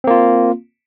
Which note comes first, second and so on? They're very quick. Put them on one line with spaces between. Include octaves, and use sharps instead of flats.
C4 A#3 F4